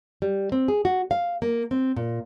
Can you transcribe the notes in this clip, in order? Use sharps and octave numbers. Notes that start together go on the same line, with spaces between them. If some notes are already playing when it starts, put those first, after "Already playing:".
G3
C4
G#4
F#4
F5
A#3
C4
A#2